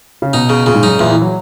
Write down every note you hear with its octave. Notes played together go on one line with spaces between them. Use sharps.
C#3
B2 D#4
C#3
A#2 C#3
G#2
F#2 D#4
E2 A#2
E3
F#3